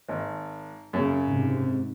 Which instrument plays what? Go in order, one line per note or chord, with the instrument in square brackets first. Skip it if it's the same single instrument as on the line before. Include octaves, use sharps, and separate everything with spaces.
[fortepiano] G#1
F#2 C#3
[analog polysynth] G#2 C3